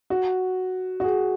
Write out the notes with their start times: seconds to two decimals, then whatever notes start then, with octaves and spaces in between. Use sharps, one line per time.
0.10 F#4
1.00 F#4
1.04 G#4